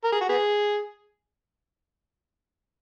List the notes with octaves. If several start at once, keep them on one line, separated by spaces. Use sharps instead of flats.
A#4
G#4
F#4
B3 G#4